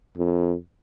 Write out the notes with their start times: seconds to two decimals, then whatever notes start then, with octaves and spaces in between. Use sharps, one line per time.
0.17 F2